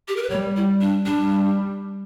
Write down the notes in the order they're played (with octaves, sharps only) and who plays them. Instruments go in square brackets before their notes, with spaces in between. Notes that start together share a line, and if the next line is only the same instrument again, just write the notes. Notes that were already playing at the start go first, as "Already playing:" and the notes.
[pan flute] G4
A#4
B4
[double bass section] G3 [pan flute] C#5
[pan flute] E4
D4
[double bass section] G3 [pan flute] D4